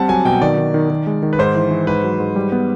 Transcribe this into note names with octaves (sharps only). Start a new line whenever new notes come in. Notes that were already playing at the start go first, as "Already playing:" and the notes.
Already playing: G3 C4 F#5 A5
F#3 G#5
B2 G5
D#3 D5
D#3
D#3
D#3
G#3
D#3
B4
G#2 C5
E3
E3
G#2 B4
F#3
G#2
G3
B3